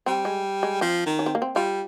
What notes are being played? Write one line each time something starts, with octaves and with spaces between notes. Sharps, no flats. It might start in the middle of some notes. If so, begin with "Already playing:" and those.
G3 C4
G#3
G#3
F3 C4
D#3
C#4
C4
A#3
C4
G3 F4